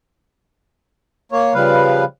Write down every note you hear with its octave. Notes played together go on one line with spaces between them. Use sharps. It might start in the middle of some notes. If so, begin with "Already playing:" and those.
A#3 C#5
C#3 F3 G3 B4 F5